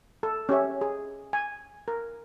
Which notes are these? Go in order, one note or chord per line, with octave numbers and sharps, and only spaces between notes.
A4
C#4 G4 C#5 E5
G#4
G#5
A#4